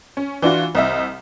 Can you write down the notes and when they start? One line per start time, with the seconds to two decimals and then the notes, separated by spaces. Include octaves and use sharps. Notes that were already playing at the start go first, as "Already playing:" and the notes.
0.17 C#4
0.42 E3 D4 F4 F#4
0.75 C2 D#5 E5